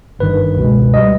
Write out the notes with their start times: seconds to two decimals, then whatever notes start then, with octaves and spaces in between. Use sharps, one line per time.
0.19 G1 G2 D#3 B4
0.57 C#2 B2 G#3
0.94 G3 D#5